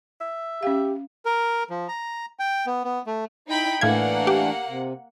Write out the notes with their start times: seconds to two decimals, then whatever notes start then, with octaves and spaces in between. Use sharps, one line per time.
0.21 E5
0.63 C#4 G4 F5
1.25 A#4
1.70 F3
1.88 A#5
2.39 G5
2.66 B3
2.84 B3
3.06 A3
3.48 D#4 E4 G5 B5
3.81 A2 E3 A3 A#3 D4 F5 F#5 G#6
4.27 G4
4.68 C3